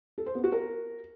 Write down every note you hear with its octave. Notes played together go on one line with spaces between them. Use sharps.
A4
C5
B3
F#4
A#4